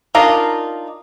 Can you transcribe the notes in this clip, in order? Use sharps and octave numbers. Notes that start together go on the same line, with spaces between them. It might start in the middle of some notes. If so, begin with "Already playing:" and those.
D4 D#4 F4 A#4 A#5